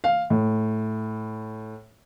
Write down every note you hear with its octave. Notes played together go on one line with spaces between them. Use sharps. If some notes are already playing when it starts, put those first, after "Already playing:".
F5
A2